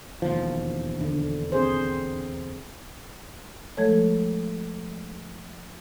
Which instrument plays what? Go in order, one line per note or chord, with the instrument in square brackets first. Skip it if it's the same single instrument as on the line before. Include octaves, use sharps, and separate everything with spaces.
[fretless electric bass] E1 D#2 F3
[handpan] D3
C4 G#4 C5
[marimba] F3 G#3 A3 A4 C#5